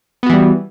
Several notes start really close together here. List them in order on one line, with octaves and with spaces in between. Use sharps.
B3 F#4 E3 G3